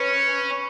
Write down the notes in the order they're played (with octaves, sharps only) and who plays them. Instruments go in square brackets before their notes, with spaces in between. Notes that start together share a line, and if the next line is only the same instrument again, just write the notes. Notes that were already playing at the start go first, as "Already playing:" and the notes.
Already playing: [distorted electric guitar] C#4 [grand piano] B4